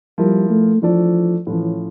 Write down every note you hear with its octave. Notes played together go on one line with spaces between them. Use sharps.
F3 G3 A#3 E4 A#4
A3
E3 F3 A3 D4 A4 D5
A2 E3 F3 C#4